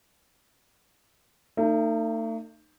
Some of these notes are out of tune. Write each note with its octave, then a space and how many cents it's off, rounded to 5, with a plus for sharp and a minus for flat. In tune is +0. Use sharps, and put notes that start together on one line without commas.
A3 +40 D#4 -20